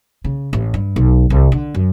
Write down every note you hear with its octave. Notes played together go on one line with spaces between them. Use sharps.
C#3
A1
G2
B1
C2
D3
F#2